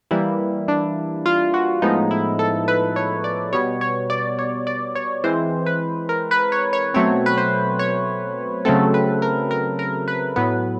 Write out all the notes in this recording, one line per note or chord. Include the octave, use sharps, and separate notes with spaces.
E3 G3 A#3 E4
D4
F4
F#4
A2 F3 G#3 B3 D#4
E4
A4
B4
C#5
D5
B2 G3 B3 C#5
C#5
D5
C#5
D5
C#5
E3 G#3 C4 C5
B4
A#4
B4
C#5
C#5
B2 F#3 A3 C4 C#5
B4
C5
C#5
C#3 F#3 A3 C4 A4
B4
A#4
A#4
A#4
B4
A2 F#3 B3 B4